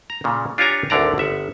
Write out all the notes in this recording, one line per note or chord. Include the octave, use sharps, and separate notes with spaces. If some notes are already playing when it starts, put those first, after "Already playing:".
A#5
A#2 C#3
D4 F4 G4 C#5 G#5 A#5
G#1 D2 D3 D5 A#5
G1 E5 F#5